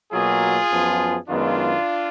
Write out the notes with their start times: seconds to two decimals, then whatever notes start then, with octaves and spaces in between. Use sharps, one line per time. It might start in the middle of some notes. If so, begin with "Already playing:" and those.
0.12 B2 F#3 A#3 F4 G#4
0.70 F#2 F3 B3
1.28 F#2 D#3 G#3 B3 D4 F4